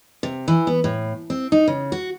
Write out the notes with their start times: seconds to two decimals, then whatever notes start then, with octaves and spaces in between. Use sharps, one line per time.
0.23 C3
0.48 E3
0.67 B3
0.84 A2
1.30 C4
1.52 D#4
1.68 C#3
1.92 F#4